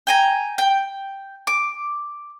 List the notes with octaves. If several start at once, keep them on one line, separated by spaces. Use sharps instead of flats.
G5 G#5 A#5
G5
D6